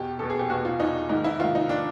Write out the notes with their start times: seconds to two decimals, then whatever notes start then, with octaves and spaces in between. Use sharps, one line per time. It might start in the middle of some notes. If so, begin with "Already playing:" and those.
Already playing: E2 B2 G4
0.19 E2 B2 A4
0.30 G#4
0.39 G4
0.50 E2 B2 F#4
0.65 F4
0.79 E2 B2 D#4
1.09 G#2 D#3 D#4
1.24 E4
1.40 G#2 D#3 F4
1.55 D#4
1.69 D#3 D4